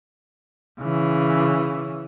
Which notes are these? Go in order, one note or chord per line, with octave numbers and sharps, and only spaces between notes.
C#3 E3